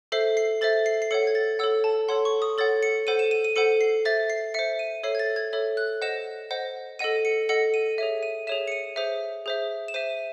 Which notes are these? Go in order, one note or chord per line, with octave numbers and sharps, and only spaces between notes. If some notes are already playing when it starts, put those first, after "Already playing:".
A4 C5 E5 C7
C7
A4 C5 E5 A6
C7
C7
A4 C#5 F#5 C#7
G#6
A6
A4 C#5 F#5 E6
A5
A4 C#5 F#5 C6
C#6
D#6
A4 C#5 F#5 A6
C#7
A4 C5 F#5 D#7
E7
D#7
D#7
A4 C5 F#5 C#7
C7
C5 E5 A6
C7
C5 E5 C#7
D#7
A4 C#5 E5 C7
G#6
A6
G#6
A4 C#5 E5
F#6
C5 D#5 F#5 E7
C5 D#5 F#5
A4 D#5 F#5 D#7
C#7
A4 D#5 F#5 C#7
D#7
G#4 C#5 E5
D#7
G#4 C#5 E5 E7
C#7
D#7
G#4 C5 E5
G#4 C5 E5
E7
C5 E5 D#7